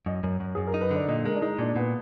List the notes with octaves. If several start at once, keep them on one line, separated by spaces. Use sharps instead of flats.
F#2 D#5
F#2
F#2
F#2 G#4
A#4
D#4
B4
D3 D5
A#2 D#5
G#3 A#4
D4
G#3 D#4
A#2 D4
A#2 B3